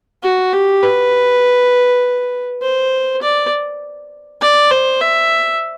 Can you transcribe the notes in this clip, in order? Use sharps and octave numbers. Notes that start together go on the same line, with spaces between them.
F#4
G4
B4
C5
D5
D5
C5
E5